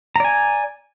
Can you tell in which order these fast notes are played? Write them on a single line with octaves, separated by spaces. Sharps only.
A#5 D5 G#5